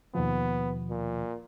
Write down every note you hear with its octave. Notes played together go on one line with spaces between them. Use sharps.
D#2 B2 F3 B3
A#2